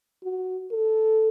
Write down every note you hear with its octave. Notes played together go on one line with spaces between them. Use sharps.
F#4
A4